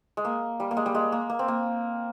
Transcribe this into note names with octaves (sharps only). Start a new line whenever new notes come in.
G#3
A#3
G3
A#3
G#3
G3
G#3
A#3
A#3
C4
A#3